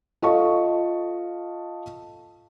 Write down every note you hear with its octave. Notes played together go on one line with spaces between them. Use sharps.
F4 A4 D#5 F5 A5 C#6